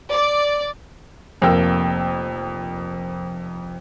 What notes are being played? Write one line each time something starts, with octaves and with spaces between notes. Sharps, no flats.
D5
F1 F2 A#3 A#4 G5 E6